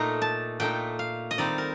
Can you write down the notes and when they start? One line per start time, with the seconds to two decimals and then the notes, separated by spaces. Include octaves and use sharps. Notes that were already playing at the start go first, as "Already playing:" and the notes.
Already playing: A#2 A3 D#4 A#5
0.22 A5
0.60 A#2 A3 D#4 G5
0.99 F5
1.31 D#5
1.38 D#3 G3 C4 D#4 D5
1.58 A#4